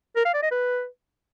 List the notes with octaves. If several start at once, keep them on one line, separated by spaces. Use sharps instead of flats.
A#4
F5
D5
D#5
B4